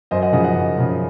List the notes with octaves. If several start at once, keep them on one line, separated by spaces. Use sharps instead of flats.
F#2 C5 D#5
D#5 F#5
C#3 F3 D#5 F#5
D#5 F#5
F#2
C#3 F3